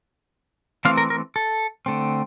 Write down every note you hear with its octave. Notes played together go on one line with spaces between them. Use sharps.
E3 A3 C4 F5
A#4
A#4
A4
D3 A3 C4